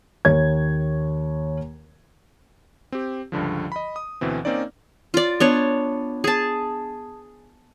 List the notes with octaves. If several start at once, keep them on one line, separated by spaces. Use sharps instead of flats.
D#2 C#5 G#6
C4 G4
C#2 G2 D3 F3
D#5 B5
D#6
D2 B2 E3 C4
A#3 C4 C#4 D#4 D5
F4 D5
B3 D4 C#5
G#4 A5